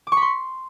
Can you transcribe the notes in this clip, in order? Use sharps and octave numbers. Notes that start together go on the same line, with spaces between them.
D6
C#6
B5
C6